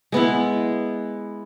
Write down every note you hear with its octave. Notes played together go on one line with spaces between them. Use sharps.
G#3 B3 E4